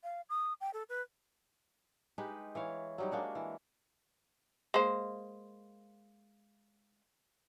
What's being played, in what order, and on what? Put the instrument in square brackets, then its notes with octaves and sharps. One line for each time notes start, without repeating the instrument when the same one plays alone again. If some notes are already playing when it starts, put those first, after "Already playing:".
[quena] F5
D#6
G5
A4
B4
[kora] G#3 D#4 G4 B4
E3 C#5 F5
F#3 G3 D#4
G#3 A#3 D4 F#4
E3
[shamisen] G#3 A#3 C5